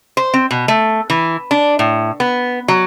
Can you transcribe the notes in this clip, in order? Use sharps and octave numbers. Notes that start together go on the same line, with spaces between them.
C5
C4
B2
A3
E3
D4
A2
B3
F#3